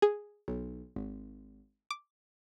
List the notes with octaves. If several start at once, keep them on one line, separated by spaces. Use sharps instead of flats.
G#4
B1
G#1
D6